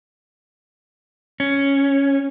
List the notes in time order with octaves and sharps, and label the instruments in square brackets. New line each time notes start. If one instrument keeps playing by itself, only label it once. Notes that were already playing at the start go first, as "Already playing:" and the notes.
[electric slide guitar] C#4